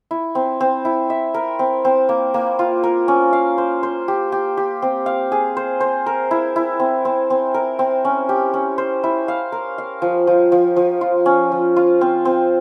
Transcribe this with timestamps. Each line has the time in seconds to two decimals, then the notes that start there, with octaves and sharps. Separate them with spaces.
0.11 E4
0.35 C4
0.60 C4
0.85 E4
1.10 E5
1.34 A#4
1.59 C4
1.85 C4
2.09 A#3
2.34 A#3
2.59 F4
2.83 A#4
3.08 C#4
3.33 F5
3.58 C5
3.83 C5
4.08 G4
4.32 G4
4.57 G4
4.82 C4
5.06 F5
5.32 G#4
5.57 C5
5.80 C5
6.06 A#4
6.31 E4
6.56 E4
6.80 C4
7.05 C4
7.30 C4
7.54 A#4
7.79 C4
8.05 C#4
8.29 G4
8.54 C#4
8.78 C5
9.04 E4
9.28 F5
9.52 A#4
9.78 F5
10.02 F3
10.27 F3
10.52 F3
10.76 F3
11.01 F4
11.26 C#4
11.52 F3
11.76 F4
12.01 C4
12.25 C4